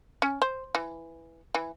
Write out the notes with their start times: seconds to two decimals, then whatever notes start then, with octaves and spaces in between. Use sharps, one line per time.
0.22 C#4
0.42 C5
0.75 E3
1.55 E3